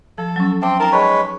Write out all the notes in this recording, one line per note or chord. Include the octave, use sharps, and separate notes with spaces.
F3 A4
F#3 C#4
C4 E5 A5 D6
D#4 A#4 G5 A5
G#3 B4 C#5 A5